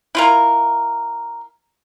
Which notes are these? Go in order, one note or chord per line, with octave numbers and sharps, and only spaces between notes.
E4 F4 A#4